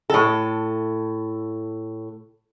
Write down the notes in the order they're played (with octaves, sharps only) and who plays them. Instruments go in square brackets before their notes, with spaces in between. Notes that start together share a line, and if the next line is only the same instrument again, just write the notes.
[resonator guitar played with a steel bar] A2 A4